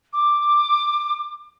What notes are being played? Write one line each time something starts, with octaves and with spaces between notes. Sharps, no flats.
D6